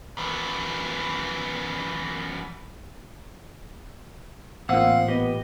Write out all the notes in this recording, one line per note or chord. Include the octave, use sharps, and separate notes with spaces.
F#2 E3
A1 A#2 C4 F5 F#5 D#6 E6
B3 G4 D#5